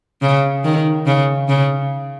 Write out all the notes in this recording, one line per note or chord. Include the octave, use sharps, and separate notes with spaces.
C#3
D#3
C#3
C#3